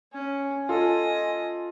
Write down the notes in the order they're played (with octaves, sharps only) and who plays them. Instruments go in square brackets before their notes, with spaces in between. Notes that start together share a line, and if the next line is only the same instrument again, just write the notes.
[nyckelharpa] C#4 [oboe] G#5
[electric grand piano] F4 A4 [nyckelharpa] D#5